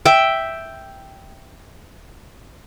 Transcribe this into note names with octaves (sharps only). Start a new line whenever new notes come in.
E5 G5